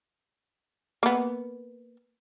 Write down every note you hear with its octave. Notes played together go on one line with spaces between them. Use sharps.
A#3 B3